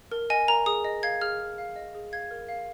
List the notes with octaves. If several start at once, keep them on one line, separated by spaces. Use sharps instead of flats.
A#4
D#5 G#5
A#4 A#5
G#4 D#6
D#5
F5 G#6
G#4 F6
G#4
F5
D#5
G#4
F5 G#6
A#4
F5